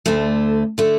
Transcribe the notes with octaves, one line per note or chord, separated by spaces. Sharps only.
D2 D3 A3
D3 A3